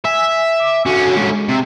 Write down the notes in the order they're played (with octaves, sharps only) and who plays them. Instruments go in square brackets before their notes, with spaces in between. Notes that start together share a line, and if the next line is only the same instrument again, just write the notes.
[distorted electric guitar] E5 [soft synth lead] G#5
[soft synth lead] D6
[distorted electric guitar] D3 C#4 [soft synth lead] F#4
[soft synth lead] G#3
[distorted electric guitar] C3